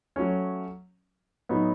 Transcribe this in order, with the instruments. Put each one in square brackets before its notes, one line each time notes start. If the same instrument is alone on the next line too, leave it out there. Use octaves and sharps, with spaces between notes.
[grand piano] F#3 A3 C#4
A2 F#3 B3 D#4